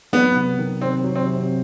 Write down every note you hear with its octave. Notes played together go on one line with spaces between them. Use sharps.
F#3 B3
C3
D#3
C3 C4
F#3
C4
C3